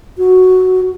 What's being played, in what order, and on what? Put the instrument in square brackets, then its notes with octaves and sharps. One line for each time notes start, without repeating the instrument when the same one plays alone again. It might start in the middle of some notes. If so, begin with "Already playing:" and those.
[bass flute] F#4